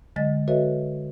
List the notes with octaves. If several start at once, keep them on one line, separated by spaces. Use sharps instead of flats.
D3 F#3 G#3 D#5 A6
F#4 A4 B4 C#5 D#5 E5